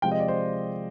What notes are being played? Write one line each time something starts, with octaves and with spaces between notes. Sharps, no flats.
C3 F3 G#3 G5
D#5
D5
C5